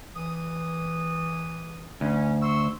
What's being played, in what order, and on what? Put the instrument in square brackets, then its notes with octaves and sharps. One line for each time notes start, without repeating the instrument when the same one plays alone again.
[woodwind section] E3 D#6
[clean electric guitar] D2 [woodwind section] C#4
[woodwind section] C6 C#6 E6